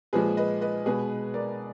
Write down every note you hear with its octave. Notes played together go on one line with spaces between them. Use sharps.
A#2 F3 G#3 G#4 B4
B4 D#5
B4 D#5
B2 G#3 G#4 B4
A#4 D5